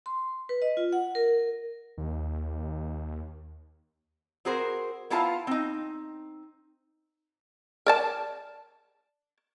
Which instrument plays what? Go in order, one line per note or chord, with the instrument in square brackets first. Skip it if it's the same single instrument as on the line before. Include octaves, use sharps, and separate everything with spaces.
[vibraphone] C6
B4
D#5
F4
F#5
A#4
[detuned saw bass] D#2
[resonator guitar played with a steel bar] C4 F#4 G#4 A#4 C5
B3 E4 F4 F5 A5 A#5
C4 D#4
[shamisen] A#4 D5 A5